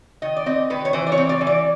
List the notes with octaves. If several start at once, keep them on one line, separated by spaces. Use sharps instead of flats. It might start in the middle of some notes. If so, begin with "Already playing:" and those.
D#3 D#5
D5
C4 D#5
D#3 B4
C#5
E3 C5
D5
C#5
C4
D5
E3
D5